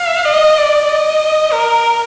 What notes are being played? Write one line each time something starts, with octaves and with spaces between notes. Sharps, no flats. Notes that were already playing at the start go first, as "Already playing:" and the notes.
Already playing: F5
D#5
D5
D#5
A#4